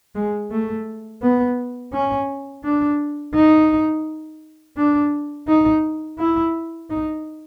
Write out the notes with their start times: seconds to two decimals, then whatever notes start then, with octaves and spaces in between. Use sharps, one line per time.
0.15 G#3
0.51 A3
1.22 B3
1.93 C#4
2.64 D4
3.35 D#4
4.77 D4
5.48 D#4
6.19 E4
6.89 D#4